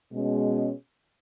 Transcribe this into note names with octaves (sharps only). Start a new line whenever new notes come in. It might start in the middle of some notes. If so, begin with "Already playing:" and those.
B2 G#3 C#4